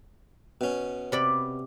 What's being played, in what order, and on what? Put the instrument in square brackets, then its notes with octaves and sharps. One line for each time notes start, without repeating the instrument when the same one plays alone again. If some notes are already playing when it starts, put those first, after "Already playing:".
[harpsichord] B2 C#4
[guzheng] C3 D5 B5